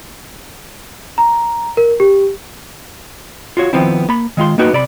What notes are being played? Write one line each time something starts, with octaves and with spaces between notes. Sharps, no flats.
A#5
A#4
G4
F4 F#4 C#5
D#3 F3 B3 C4 E4
A#3 B5
D#3 G#3 F4 C6
A#3 B3 D#4 F#4 B4 G5
C3 D5 B5